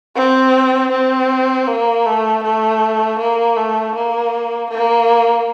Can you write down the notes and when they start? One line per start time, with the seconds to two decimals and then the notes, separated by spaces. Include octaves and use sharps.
0.16 C4
0.91 C4
1.67 A#3
2.06 A3
2.43 A3
3.19 A#3
3.56 A3
3.95 A#3
4.70 A#3